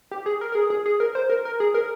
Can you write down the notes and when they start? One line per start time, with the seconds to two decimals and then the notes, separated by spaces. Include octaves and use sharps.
0.11 G4
0.26 G#4
0.41 A#4
0.52 A#4
0.55 G#4
0.70 G#4
0.86 G#4
1.00 A#4
1.15 C5
1.30 A#4
1.45 A#4
1.60 G#4
1.74 A#4